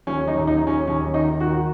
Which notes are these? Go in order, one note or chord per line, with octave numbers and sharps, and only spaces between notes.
D#2 C#4
D#4
D#2
D#4
D#2
C#4
D#2 C#4
D#3 D#4
D#3 F#4